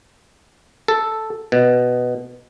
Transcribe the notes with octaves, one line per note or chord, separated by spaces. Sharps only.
A4
B2